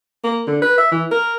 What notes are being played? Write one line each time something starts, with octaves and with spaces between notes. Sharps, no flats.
A#3
D3
B4
E5
E3
A#4